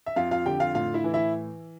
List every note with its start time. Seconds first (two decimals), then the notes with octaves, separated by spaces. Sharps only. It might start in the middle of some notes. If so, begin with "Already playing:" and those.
0.06 E5
0.16 F2 F4 F5
0.31 F4 F5
0.46 D3 G4 G5
0.60 F4 F5
0.74 A2 F4 F5
0.94 E4 E5
1.04 E3
1.13 E4 E5